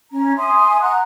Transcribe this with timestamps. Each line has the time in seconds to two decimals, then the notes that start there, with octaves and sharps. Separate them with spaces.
0.11 C#4 A#5
0.36 E5 G#5 C6 D#6
0.80 F#5 A#5 F#6